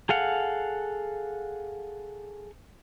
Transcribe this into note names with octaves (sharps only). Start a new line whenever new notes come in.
G#4 A4 F5 F#5